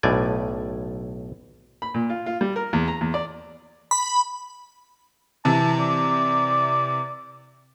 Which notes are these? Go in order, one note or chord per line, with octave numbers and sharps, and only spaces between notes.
B1 A2 D5 G#5
B5
A#2
F4
F4
G3
A#4
E2
A#5
E2
D5
B5
C3 E3 A5
D5